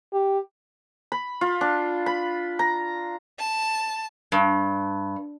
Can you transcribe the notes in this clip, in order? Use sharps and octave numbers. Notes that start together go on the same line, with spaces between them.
G4
B5
F4
D4
B5
A#5
A5
G2